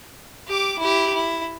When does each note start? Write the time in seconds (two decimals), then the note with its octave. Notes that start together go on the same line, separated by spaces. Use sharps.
0.48 G4 D6
0.79 E4 G4
1.14 E4